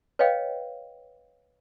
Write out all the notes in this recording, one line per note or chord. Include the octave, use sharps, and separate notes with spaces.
B4 C#5 D#5 F5 G5